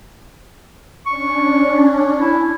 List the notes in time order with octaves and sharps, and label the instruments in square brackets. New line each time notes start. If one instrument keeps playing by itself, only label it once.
[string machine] C#4 D4 [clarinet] C#6
[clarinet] E4